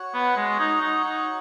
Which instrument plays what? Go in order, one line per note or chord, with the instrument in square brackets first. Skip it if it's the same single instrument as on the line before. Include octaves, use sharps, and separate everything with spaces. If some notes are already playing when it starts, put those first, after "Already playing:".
Already playing: [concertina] F#4 C#5 F#5
[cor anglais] B3
G#3
D#4
D#4
D#4